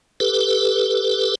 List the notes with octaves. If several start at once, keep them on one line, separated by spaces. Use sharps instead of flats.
G4 A4 B4